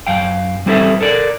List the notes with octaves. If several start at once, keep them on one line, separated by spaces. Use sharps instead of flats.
F#2 F5 G5
G3 C4 E4 A4 B4 E5
A4 A#4 D5